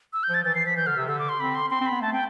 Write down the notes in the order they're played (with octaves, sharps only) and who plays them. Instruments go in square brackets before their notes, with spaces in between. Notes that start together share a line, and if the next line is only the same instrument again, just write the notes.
[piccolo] E6
G6
[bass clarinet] F3 [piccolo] A6
[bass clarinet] E3 [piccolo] A6
[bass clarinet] E3 [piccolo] C7
[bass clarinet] F3 [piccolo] B6
[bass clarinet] E3 [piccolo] G6
[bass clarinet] D3 [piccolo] F6
[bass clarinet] C3 [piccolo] E6
[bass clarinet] D3 [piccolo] E6
[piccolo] D6
C6
[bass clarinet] C4 [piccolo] B5
[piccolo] C6
[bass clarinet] C4 [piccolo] C6
[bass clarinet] C4
[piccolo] B5
[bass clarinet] B3
[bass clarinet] A3 [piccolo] A5
[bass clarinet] C4 [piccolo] G5